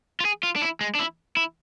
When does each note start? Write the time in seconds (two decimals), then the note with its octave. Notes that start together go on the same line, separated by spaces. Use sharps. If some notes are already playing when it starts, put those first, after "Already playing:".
0.20 F4
0.25 G#4
0.43 F4
0.56 D4
0.62 E4
0.81 G#3
0.95 D4
0.99 E4
1.37 E4